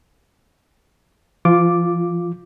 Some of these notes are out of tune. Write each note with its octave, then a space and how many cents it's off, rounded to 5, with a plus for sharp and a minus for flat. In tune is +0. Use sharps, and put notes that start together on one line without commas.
F3 -40 F4 +0 D6 +0